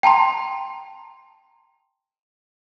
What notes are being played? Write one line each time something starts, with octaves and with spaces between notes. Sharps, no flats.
G5 A5 A#5 C6